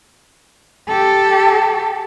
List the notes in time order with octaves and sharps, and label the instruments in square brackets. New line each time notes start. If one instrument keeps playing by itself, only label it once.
[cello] G4 A4